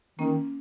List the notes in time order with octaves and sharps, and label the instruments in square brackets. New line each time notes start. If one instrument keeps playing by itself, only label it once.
[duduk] D#3 [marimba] A#3 C#4